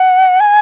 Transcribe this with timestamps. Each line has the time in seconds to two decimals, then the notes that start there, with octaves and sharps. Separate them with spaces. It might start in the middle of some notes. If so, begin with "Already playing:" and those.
Already playing: F#5
0.40 G#5